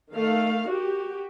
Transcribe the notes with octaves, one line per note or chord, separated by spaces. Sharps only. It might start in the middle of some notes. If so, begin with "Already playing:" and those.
D#3 A3 F5
F#4 G4